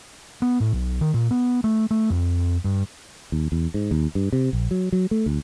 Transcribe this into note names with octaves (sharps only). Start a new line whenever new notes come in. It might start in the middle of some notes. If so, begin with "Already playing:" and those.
B3
A2
B1
D#3
A#2
B3
A3
A3
F2
G2
D#2
E2
G#2
D#2
G2
C3
A#1
F#3
F#3
A3
D2